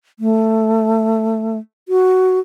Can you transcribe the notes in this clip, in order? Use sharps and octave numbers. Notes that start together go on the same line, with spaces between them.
A3
F#4